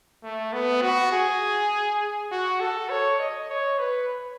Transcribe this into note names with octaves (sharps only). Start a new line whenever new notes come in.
A3
B3
F#4
G#4
F#4
A4
C#5
D#5
C#5
B4